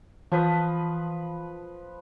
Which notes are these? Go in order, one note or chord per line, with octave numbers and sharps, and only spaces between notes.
E3 F3 B4 D#6